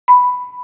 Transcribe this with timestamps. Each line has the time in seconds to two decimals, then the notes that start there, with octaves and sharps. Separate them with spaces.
0.08 B5